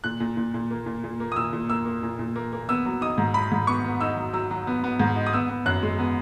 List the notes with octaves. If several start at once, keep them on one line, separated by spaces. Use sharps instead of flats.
A#2 F#6
A#2
A#2
A#2
A#3
A#2
A#2
A#3
D#6
A#2 E6
A#2
A#3 E6
A#3
A#2
A#2
A#3
A#3
B3 E6
F#3
D#4 D#6
G#2
F#3 B5
G#2
B3 C#6
B3
D#4 E6
F#3
F#3 E6
F#3
B3
B3
G#2
D#4
D#6
B3 E6
B3
F#2 F#6
G#3
B3